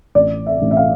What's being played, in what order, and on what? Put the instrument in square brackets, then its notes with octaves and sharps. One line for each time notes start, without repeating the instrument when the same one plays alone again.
[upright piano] A1 D5
E5
A1
E5
F5